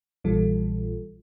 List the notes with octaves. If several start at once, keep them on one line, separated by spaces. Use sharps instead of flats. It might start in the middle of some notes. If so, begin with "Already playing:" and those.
A#1 A#2 E3 G3 F4 A4